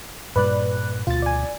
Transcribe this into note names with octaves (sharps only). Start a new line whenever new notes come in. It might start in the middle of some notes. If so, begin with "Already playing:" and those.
G2 A#2 G3 B4 D5 F#6
D2 B2 F4 A6
D5 G#5